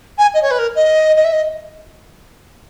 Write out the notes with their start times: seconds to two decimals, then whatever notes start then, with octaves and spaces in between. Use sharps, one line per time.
0.18 G#5
0.34 D#5
0.42 C#5
0.51 B4
0.58 A#4
0.75 D#5
1.16 D#5
1.24 E5
1.32 D#5